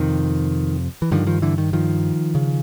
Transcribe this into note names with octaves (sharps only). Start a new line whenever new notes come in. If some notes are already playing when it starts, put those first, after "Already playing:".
Already playing: F2 C3 D#3
E3
G2 D3 D#3 F3
D#3 F3
D3 E3
D#3
D#3 F3
C#3